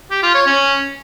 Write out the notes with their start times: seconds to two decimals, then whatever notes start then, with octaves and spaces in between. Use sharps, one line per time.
0.11 G4
0.23 F4
0.35 C#5
0.46 C#4